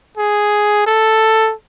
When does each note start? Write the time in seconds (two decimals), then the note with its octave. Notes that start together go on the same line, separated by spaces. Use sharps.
0.17 G#4
0.87 A4